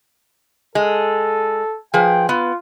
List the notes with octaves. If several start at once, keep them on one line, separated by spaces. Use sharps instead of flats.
G#3 A4
F3 G#4 B4 G5
B3 F4